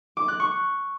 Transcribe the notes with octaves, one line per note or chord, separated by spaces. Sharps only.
D6
F#6
C#6